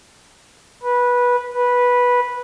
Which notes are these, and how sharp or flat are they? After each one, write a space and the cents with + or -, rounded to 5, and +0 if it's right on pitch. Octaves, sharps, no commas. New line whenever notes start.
B4 -15
B4 -10